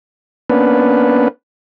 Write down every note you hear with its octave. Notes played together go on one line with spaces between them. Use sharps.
A#3 B3 C#4 D4 B4